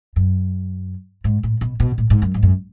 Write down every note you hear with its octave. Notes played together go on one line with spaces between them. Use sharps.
F#2
G#2
A2
B2
B2
A2
G#2
F#2
G#2
F#2